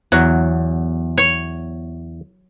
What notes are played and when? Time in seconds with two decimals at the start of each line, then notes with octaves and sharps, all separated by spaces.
0.12 E2 F#3
1.18 C#5